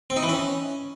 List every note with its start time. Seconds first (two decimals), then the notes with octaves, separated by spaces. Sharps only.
0.10 C4
0.16 D#4
0.23 E3
0.29 C#4